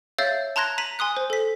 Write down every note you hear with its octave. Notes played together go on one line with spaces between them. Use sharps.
C#5 E5 F5 E6 G6 A6
A5 A#5 C6 F#6 G#6 A#6
A#5 B6 D#7 F#7
G#5 C6 D#6 F#6
C5
A4 B6